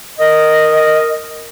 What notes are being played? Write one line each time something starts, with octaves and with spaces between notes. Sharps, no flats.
A#4 D#5